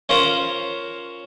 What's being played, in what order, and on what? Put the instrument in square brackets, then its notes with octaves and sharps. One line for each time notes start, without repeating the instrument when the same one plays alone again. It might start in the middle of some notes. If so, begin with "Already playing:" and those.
[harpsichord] C#4 F4 A#4 C5